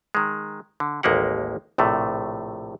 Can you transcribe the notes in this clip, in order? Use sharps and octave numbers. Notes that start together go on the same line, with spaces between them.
D#3 G#3
D3
A1 D#2 G#3 A#3 G4 F#5
A#1 A2 C3 A3